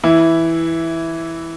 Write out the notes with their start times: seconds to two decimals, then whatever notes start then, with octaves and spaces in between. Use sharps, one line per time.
0.04 E3 E4